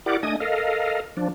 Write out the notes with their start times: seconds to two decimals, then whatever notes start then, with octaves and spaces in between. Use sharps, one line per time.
0.06 E4 G4 A#4 D5 F#5 D6
0.23 A3 D4 D#5 G#5 D#6
0.40 A4 A#4 D#5 F5
1.17 F3 D4